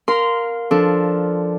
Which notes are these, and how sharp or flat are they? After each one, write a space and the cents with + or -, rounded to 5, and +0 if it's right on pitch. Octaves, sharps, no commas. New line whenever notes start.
A#4 +0 F5 +15 C6 -15
F3 +0 D4 +0 A4 -10